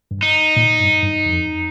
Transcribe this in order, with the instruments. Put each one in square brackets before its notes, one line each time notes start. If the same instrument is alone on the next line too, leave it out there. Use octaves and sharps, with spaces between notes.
[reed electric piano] G2
[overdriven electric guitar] D#4
[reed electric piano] A#2
G2
G2
F2